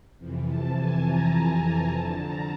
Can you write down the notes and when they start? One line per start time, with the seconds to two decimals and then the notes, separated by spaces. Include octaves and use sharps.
0.18 F2 C3 E3
0.48 A5
0.76 G#5
1.05 A#5
1.33 A5
1.63 A#5
1.92 F2 D3 A5
2.21 A#5